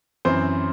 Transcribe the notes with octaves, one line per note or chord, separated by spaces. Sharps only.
F#2 E3 C4 C5